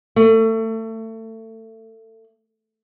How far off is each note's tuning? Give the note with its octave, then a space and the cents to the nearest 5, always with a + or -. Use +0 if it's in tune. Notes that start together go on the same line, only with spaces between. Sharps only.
A3 +25